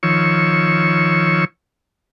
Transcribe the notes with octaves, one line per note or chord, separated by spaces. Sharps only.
D#3 F3 C#5 C#6 E6